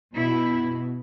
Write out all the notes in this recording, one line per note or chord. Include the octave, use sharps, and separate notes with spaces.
B2 E4